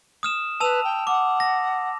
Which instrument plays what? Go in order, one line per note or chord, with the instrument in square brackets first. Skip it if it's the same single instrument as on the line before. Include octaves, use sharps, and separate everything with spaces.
[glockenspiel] D#6 F6 E7
[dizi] B4 [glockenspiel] A5 E6 F7
[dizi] G5
[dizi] F#5 [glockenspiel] D6
[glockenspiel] A#6